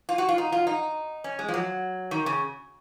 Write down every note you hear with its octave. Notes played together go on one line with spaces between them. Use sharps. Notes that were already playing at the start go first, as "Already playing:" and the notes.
F4
F#4
F4
D#4
F4
D#4
C#4
G#3
F3
F#3
D#3
C#3